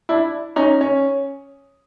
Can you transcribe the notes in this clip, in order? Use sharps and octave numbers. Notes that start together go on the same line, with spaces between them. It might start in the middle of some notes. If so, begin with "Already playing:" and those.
D4 E4
C#4 D#4
C#4